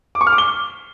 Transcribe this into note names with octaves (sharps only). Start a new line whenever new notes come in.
D6
C#6
F6
D6
G7